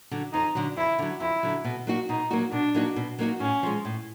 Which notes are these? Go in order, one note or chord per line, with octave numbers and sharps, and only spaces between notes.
D3 F#3
F2 D#4
D3 F#3
F2 E4
D3 F#3
F2 E4
D3 F#3
B2
F#3 A#3 D#4 F#4
B2 D#4
F#3 A#3 D#4 F#4
B2 D4
F#3 A#3 D#4 F#4
B2
F#3 A#3 D#4 F#4
A2 C#4
F3 G#3
A2